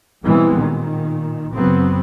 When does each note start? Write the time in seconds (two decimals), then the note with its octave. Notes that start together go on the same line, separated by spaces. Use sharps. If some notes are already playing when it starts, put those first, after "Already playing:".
0.25 B2 E3 G3 G#3 B3 C4
0.55 A#2 D#3
1.54 F#2 C#3 F#3 B3 C4